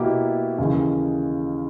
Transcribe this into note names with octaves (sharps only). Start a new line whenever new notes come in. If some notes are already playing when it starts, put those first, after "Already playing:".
Already playing: B2 A#3 E4 G4
D#2 C#3 E3